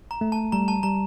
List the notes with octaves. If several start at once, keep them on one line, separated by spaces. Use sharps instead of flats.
A#5
A3
A5
G3 A#5
A5
G3 A#5